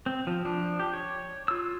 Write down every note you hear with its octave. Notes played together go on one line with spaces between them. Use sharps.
C4
F3
F3 D4
G4
C#5
F4 E6